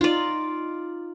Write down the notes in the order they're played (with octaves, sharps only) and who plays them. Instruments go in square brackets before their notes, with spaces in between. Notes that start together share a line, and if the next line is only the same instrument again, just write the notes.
[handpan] D#4 [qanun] F4 D5